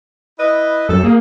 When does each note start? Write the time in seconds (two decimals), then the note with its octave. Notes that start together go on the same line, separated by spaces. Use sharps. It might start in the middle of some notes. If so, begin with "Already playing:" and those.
0.39 E4 B4 D#5
0.89 F#2 A4
1.03 A#3 G#4